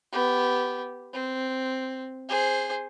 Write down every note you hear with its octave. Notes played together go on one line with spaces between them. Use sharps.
B3 G4
C4
G#4 C5